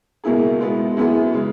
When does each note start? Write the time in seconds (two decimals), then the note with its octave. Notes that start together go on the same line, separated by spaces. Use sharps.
0.24 C#2 B2 A#3 E4 G#4
0.60 B2 G#3 B3 E4
0.97 F#2 E3 B3 E4 G#4
1.33 C#3 G#3